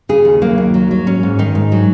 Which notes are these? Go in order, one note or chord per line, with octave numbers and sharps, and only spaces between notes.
C#3 G#4
D#2
F#3 A#3
D#2
F#3
F#3
G#2 C#4
G#2
D#3 D#4
G#2
F#3